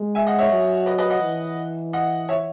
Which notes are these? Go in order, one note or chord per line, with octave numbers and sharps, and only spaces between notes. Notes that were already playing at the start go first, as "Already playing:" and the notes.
Already playing: G#3
E5 G#5
D#5 F#5
C#5 E5
F#3
B4 D#5
B4 D#5
D#5 F#5
E3
D#5 F#5
C#5 E5